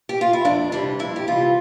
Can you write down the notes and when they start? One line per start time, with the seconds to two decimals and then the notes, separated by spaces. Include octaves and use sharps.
0.09 G4
0.21 F4
0.33 E4
0.45 F2 D4
0.72 C3 E3 G3 D4
0.99 F2 E4
1.16 G4
1.27 C3 E3 G3 F4